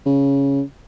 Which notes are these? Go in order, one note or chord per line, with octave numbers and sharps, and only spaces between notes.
C#3